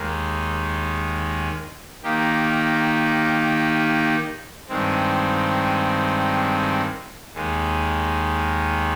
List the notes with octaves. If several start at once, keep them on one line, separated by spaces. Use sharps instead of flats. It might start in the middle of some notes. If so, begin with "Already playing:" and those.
Already playing: D#2 D#3 G#3
D#3 A#3 D#4 G4
G2 D#3 G#3 C4
D#2 D#3 G#3